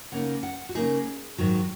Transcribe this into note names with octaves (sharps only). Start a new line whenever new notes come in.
C#3 A#3 D#4 F#5
F#5
F#4
C#3 A#3 D#4 G#4
G#2 D#3 F#3